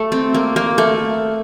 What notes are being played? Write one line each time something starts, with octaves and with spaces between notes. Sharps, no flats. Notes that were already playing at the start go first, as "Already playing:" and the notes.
Already playing: A3
C4
A#3
A#3
A3